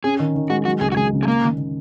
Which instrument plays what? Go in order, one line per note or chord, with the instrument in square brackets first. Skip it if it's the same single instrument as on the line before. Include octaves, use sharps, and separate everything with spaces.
[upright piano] C#4 [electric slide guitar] G#4
[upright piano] D#3
D#3
[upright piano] G#3 [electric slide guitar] F#4
[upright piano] F#3 [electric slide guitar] F#4
[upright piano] C#2 [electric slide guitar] G#4
[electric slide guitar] F#4
[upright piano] C#2 [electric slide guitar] G#4
[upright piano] C#3
[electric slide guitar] G#3
[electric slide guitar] A#3 [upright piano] C#4
[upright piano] D#3
D#3